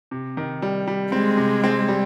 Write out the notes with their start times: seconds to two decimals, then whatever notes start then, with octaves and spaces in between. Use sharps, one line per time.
0.11 C3
0.37 D#3
0.62 G3
0.87 G3
1.12 G#3 C4
1.37 C3
1.64 C4
1.88 G3